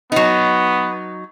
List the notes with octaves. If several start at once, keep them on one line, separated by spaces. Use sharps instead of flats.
F#3 B3 D#4